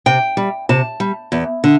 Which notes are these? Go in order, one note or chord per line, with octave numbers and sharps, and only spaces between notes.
C3 G5
G3
C3 A5
G3
E2
D3